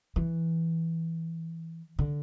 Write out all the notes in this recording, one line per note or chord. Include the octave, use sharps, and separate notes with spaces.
E3
D3